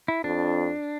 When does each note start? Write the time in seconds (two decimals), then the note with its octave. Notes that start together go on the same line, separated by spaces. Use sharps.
0.08 E4
0.24 F2 D4